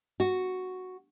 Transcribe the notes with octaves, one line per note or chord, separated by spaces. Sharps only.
F#4